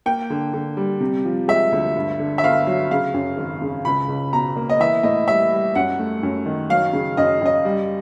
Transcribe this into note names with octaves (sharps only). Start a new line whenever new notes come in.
A#3 G5
D3
D3
G3
C3
F3
G#3 E5
D2
G2
D3
E5
G1 F5
F#3
C#3 F5
F#2
G#1
C#3
C#2 B5
C#2
B2 A#5
A#3
D#5
E3 E5
A2 D#5
G3 E5
G3
F#2 F#5
A3
F#2
D#3
F#3 F5
C#3
F#2 D#5
F#2 D#5
G3